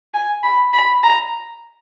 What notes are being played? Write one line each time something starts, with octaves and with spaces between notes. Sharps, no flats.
G#5
B5
B5
A#5